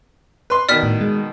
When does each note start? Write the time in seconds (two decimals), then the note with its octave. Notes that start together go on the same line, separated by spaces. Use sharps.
0.50 B4 C6
0.69 B2 D#3 D5 F6 B6
0.83 A2
1.01 G#3